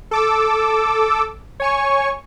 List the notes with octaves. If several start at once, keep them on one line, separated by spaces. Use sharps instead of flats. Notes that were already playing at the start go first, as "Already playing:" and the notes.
A4 D6 E6
C#5 G#5 C#6